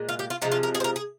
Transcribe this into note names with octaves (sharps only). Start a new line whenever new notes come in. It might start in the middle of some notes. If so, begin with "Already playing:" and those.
Already playing: A#2 G#3
F4
G4
F4
C3 F3 G#3 D#4
F4
A#4
G#4
C5
A#4
G#4